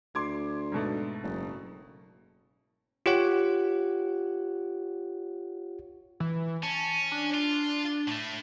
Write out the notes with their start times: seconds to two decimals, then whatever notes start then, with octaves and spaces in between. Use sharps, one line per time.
0.15 D2 C6 D6 G#6
0.72 G#2 B2 A3
1.23 F#1
3.06 F4 G4 C#5 F#5
6.20 E3
6.63 C#4 A5
7.12 D4
7.34 F4
8.08 A2 A3